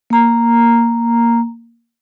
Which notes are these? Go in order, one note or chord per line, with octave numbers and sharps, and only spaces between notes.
A#3 A#5